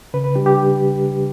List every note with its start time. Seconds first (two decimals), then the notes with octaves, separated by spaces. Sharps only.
0.14 C#3 B4
0.24 B4
0.35 G3 D4 G4
0.46 G4